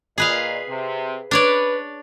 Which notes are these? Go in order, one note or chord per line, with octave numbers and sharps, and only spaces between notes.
A#2 G#4 B4 D#5 F5
C3
D4 B4 C#5 D5